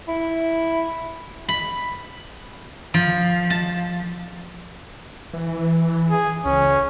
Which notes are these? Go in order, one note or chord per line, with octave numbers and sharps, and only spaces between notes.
E4
B5
F3
A5
E3
G#4
C#2 C#4